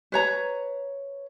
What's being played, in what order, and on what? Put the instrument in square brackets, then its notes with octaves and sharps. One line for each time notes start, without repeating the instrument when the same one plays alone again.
[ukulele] B4 C#5 A#5